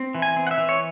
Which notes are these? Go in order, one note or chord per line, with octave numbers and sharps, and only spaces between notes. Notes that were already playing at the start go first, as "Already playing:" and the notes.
Already playing: C4
E3
G#5
C4
F#5
E5
E3
C#5